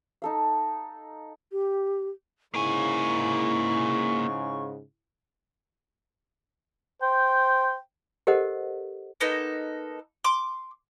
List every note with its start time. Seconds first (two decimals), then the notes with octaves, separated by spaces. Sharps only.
0.22 D#4 A4 F5
1.52 G4
2.54 G#2 C#3 A#3 E4 G#5 C#6
7.02 C5 G5
8.27 G4 A4 A#4 C5 D#5 F#5
9.20 A#3 B3 D#4 A4
10.24 C6 D6